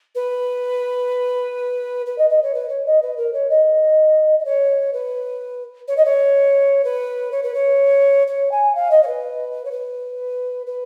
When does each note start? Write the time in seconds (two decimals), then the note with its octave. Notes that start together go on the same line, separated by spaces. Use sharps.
0.15 B4
2.06 B4
2.18 D#5
2.30 D#5
2.42 C#5
2.54 B4
2.69 C#5
2.86 D#5
3.02 B4
3.17 A#4
3.33 C#5
3.50 D#5
4.39 D#5
4.45 C#5
4.93 B4
5.88 C#5
5.97 D#5
6.05 C#5
6.84 B4
7.32 C#5
7.43 B4
7.54 C#5
8.27 C#5
8.51 G#5
8.75 F5
8.91 D#5
9.03 C#5
9.07 B4
9.65 C#5
9.71 B4
10.67 B4